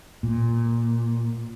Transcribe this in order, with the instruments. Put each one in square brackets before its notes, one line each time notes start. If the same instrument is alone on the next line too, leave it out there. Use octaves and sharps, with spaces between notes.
[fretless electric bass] A#2